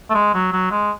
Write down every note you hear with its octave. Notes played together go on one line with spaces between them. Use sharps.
A3
G#3
F#3
F#3
G#3